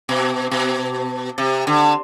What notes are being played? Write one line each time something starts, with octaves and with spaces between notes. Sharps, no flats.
B2
B2
C3
D3